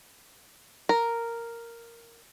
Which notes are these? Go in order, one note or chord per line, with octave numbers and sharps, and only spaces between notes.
A#4